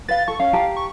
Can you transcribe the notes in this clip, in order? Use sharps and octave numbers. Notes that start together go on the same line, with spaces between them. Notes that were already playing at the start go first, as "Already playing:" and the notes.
B4 F5 A6
A4 C#6
C#4 F5
G4 A5 A#5
C#6